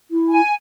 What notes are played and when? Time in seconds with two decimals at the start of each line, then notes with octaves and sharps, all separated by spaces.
0.11 E4
0.30 G#5